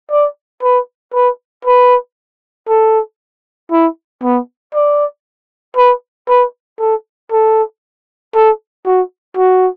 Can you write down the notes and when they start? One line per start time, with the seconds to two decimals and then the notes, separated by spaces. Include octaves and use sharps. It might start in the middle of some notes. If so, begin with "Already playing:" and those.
0.11 D5
0.63 B4
1.14 B4
1.65 B4
2.69 A4
3.72 E4
4.23 B3
4.74 D5
5.77 B4
6.29 B4
6.80 A4
7.32 A4
8.35 A4
8.86 F#4
9.37 F#4